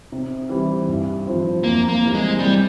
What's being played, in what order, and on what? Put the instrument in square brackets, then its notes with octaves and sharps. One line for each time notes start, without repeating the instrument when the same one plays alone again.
[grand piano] C3
E3 G3 C4 E4
G2
F3 C4 E4
[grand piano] F2 [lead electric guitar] A#3
[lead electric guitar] A#3
[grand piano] E3 G3 C4 E4
[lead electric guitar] G#3
[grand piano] C3 [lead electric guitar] G3